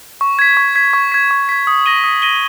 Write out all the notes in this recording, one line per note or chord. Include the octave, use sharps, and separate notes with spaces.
C#6
G#6 B6
C#6
G#6 B6
C#6
G#6 B6
C#6
G#6 B6
D#6
A#6 D#7 G7
D#6
A#6 D#7 G7